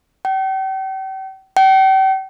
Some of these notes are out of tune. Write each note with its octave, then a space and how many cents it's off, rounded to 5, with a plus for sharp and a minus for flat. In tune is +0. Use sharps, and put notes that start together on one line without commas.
G5 -40
G5 -40